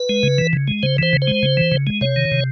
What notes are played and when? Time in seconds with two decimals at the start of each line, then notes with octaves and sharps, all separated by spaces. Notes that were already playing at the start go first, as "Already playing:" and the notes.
Already playing: B4
0.09 G#3
0.23 C#3
0.38 E3
0.53 C#3
0.68 G#3
0.83 C#3 C5
0.98 E3 C5
1.13 C#3
1.22 C5
1.27 G#3
1.43 C#3
1.57 E3
1.72 C#3
1.87 G#3
2.01 C3 C#5
2.16 D#3
2.32 C3